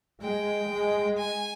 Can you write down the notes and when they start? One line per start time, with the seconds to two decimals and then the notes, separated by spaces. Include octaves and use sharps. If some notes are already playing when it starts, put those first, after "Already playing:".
0.23 G#3 G5
0.70 G#3
1.17 G#5